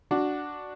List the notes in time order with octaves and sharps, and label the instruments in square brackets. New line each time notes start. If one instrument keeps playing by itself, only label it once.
[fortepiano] D4 F#4